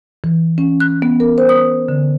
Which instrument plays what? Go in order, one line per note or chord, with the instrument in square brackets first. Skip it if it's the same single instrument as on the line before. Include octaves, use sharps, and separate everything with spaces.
[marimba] E3
C#4
F#6
B3
A#4
C5
D#6
D3